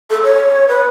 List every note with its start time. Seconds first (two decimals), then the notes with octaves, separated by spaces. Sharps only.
0.10 A4
0.23 C#5
0.68 B4